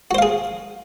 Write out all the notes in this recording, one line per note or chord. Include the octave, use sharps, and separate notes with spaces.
F#4 G#4 C5 F5